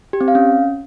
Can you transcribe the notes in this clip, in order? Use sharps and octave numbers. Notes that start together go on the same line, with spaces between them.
G4
C4
F5
C#4